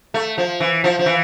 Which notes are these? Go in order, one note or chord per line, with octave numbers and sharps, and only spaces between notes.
A3
F3
E3
F3
F3
E3